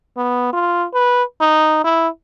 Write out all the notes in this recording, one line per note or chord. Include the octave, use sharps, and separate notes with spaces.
B3
F4
B4
D#4
E4